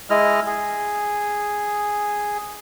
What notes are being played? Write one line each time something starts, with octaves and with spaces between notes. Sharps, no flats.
G#3 E4 D#5 F6
G#4